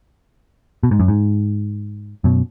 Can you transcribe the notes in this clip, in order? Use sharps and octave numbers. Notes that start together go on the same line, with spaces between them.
B2
G#2
F#2
G#2
F#2 B2